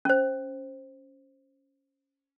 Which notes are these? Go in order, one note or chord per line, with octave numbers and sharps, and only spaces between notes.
C#4 C5